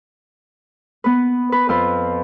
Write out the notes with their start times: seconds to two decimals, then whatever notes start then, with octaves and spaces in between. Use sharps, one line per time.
1.04 B3 B4
1.52 B4
1.69 F2 F4 B4